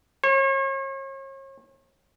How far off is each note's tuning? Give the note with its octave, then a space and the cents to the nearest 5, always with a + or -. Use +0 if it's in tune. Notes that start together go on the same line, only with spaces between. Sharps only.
C#5 -40